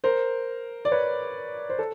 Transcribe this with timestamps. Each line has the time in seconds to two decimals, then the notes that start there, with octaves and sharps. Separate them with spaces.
0.04 A#4 C5
0.85 D5
0.92 B4 C#5
1.70 C5
1.79 A4